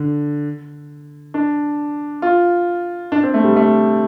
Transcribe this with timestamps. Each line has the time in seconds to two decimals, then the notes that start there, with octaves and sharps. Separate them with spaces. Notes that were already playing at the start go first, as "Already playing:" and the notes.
Already playing: D3
1.34 D4
2.22 F4
3.12 D4
3.23 C4
3.34 A3
3.44 G3
3.56 A3